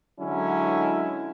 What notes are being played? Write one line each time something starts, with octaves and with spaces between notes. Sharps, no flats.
D3 F#3 G#3 C#4 E4